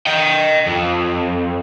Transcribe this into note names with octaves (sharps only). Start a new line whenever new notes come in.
D#5 G5
F2